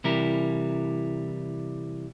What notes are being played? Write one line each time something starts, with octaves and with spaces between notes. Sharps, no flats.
C3 E3 G3 E4 A#4